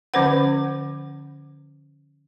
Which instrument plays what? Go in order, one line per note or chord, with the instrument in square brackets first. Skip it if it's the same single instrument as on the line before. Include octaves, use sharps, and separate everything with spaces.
[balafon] D3 F3 C#4 B4 C5 F#5